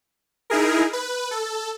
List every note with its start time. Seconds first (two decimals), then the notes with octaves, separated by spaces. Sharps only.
0.50 D#4 E4 G#4 A#4
0.93 B4
1.31 A4